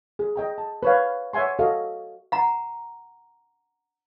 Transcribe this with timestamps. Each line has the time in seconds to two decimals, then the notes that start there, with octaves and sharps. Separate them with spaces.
0.19 G#4
0.36 D#5 G5 A#5
0.58 A5
0.83 B4 C#5 F5
1.33 C#5 E5 F#5 G#5 C6
1.59 F#4 A4 D#5 F5
2.32 F#5 A#5